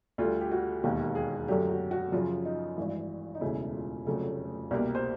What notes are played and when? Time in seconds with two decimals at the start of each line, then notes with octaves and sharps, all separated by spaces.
0.18 D2 D3 G3 F4
0.41 G4
0.52 F#4
0.83 E1 D#2 D#3 G4
1.15 G#4
1.48 F#2 D3 F#3 A3 G4
1.69 F#4
1.91 F#4
2.12 F#2 C#3 F3 F4
2.45 D#4
2.77 G#1 G2 E3 E4
3.35 D#4
3.41 E1 D2 C#3 E4
3.74 F4
4.06 F1 F2 C#3 F#3 A3
4.71 C2 B2 G3 A#3
4.95 C5